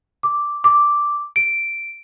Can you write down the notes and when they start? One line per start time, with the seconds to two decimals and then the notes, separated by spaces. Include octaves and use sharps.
0.23 D6
0.64 D6
1.36 D7